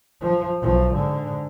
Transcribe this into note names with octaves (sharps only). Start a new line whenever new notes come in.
F3
B1 F3
G#2 D3